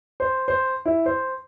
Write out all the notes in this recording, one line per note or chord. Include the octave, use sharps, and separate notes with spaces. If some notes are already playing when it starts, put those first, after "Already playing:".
C5
C5
E4
C5